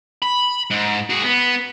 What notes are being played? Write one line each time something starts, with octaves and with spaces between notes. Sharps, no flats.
B5
G#2
F#4 G#4
B3